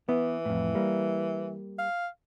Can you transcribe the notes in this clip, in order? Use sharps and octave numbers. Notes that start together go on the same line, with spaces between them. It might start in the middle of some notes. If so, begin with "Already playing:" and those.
E3 B3
F2 A2
G3 A#3
F5